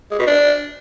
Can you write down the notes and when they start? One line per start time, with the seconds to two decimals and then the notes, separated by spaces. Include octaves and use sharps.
0.11 G#3
0.19 B2
0.27 D4